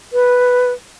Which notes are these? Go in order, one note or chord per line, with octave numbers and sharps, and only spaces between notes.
B4